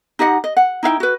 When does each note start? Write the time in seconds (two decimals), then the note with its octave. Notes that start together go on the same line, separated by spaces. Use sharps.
0.19 D#4 G4 D#5 F#5
0.44 D#5
0.57 F#5
0.83 D#4 E4 F5 G5
1.00 F#4 B4